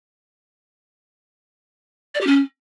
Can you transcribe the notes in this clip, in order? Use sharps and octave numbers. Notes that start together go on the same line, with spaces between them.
D5
G4
C#4